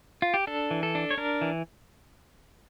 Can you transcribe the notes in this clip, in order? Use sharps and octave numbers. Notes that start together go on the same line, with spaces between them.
F4
G4
D4 A4
E3
A4
D4
C#5
D4 A#4
E3